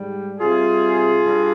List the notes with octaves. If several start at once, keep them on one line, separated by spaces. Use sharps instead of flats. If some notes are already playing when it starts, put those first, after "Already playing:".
Already playing: G#2 G3
C3 G3 F4 G#4
G2